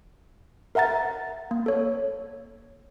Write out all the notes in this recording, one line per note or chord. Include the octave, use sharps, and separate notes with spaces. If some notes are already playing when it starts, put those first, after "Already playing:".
A#4 E5 F#5 A#5 A6
A#3
A4 C#5